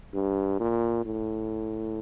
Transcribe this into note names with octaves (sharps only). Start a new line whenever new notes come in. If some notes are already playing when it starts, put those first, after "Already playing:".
G2
A#2
A2